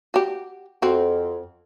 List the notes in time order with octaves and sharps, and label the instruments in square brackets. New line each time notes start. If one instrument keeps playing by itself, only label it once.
[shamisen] F#4 G4
[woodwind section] F2 [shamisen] C4 F#4